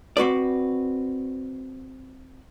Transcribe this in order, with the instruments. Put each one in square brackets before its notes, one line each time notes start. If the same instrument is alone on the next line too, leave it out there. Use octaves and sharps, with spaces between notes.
[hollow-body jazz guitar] C4 F#4 B4 D5